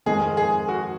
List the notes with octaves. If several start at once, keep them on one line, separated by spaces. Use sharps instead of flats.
F2 D#3 G#3 G#4
G#4
F#4